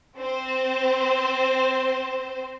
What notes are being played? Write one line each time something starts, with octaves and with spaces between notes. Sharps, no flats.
C4 C5